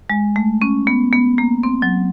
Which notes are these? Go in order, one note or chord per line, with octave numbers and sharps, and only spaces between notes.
G#3
A3
C#4
B3
B3
A#3
C4
F#3